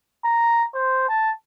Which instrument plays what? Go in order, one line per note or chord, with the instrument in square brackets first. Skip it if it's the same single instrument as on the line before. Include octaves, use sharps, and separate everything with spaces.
[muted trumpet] A#5
C5
A5